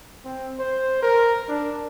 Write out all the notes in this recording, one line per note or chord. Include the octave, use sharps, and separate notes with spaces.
C4
C5
A#4
D4